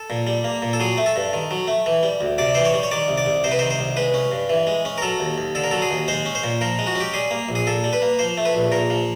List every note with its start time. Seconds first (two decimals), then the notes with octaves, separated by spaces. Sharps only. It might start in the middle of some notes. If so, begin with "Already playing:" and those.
Already playing: A4
0.10 A#2
0.27 G3
0.44 A#3
0.62 A#2
0.73 A4
0.80 F#3 G#4
0.98 A3
1.06 A4
1.16 G2
1.33 D#3
1.51 F#3
1.68 A3
1.86 E3
2.03 G3
2.21 D2
2.38 C3 D5
2.55 E3 C5
2.65 C#5
2.74 G3
2.83 C#5
2.91 D#3 D5
3.08 C2
3.18 D5
3.26 C2
3.44 C3 C5
3.52 B4
3.59 D#3 C5
3.70 C5
3.79 C2
3.97 G#3 B4
4.14 C#4
4.32 G2
4.50 E3
4.67 G#3
4.85 C#4
4.98 A#4
5.02 F#3 A4
5.20 D#2
5.38 D#2
5.55 D3 A4
5.64 A#4
5.71 F#3 A4
5.82 G#4
5.91 D#2
6.08 G#3 C5
6.26 C#4
6.35 C5
6.44 A#2
6.61 F3 A#4
6.79 G#3
6.87 F#4
6.96 C#4 G4
7.14 G3 G#4
7.31 A#3
7.49 A#1
7.55 G#4
7.67 A#2 A4
7.84 G3
7.93 B4
8.02 A#3
8.19 F3 C5
8.37 A3
8.45 B4
8.55 A#1
8.72 A#2 A#4
8.90 F3